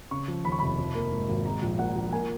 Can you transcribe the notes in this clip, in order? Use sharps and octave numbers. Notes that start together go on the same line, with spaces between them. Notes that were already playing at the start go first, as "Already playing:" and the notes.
C#3 C#6
F3
D#2 B5
C#6
F1 B5
F3
A#3
G#2
G#1
G#3 A#5
A#1
A#2 F#5
A#1
A#3 G#5